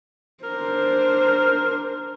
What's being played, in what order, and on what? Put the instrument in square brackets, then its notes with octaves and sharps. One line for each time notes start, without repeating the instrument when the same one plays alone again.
[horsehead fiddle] D4 C5 [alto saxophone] A#4